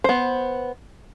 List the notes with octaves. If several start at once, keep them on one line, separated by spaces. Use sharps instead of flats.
B3 C5